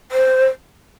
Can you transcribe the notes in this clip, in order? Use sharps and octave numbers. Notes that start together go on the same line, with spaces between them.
C5